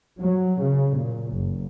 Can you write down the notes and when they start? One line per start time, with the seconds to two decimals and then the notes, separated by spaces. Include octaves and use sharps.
0.20 F#3
0.63 C#3
0.98 A#2
1.32 F#1